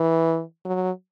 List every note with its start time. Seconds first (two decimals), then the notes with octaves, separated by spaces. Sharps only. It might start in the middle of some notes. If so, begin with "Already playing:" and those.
Already playing: E3
0.65 F#3